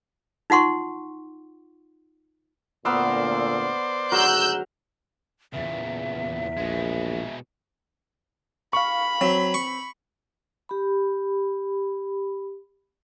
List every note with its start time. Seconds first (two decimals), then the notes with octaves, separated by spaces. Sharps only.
0.50 D#4 F4 F#5 C6 C#6
2.85 D2 A#2 B3 A#4 C5 D5 E6
4.12 G#1 D2 F#3 G#4 A#4 E6 F#6 G6
5.53 E2 A#2 C#3 E5
6.57 A#1 B2 G#3
8.73 F5 B5 C#6
9.21 F#3 C4
9.54 C#6
10.69 G4 B5